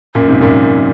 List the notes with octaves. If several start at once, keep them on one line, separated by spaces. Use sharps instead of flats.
F#2 A#2
G#2 C3
F#2 A#2